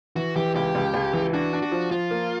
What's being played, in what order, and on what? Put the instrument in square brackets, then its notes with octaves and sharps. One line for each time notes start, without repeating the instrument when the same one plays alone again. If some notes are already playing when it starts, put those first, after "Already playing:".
[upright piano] E3 [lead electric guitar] F#4
[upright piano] E3 [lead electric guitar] G4
[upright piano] C#2 [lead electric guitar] G4
[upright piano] C#2
C#2
E3
[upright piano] D4 [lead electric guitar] F#4
[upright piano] D4
[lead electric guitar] F#4
[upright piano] F3
[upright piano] F3 [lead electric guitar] F4
[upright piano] A#3